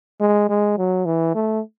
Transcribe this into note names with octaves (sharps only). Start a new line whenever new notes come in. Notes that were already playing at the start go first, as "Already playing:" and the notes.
G#3
G#3
F#3
E3
A3